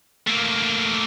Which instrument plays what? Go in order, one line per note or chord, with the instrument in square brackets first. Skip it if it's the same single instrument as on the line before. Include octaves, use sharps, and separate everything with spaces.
[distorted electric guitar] A3 A#3